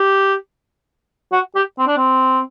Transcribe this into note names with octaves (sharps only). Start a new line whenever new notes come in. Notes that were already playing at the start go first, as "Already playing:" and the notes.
Already playing: G4
F#4
G4
C4
D4
C4